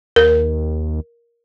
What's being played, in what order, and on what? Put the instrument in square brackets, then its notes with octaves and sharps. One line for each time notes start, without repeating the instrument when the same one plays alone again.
[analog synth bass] D#2 [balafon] A#4